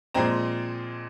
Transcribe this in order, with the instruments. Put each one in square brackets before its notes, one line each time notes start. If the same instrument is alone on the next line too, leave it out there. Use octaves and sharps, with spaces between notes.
[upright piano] A#2 F3 G#3 C4 A#5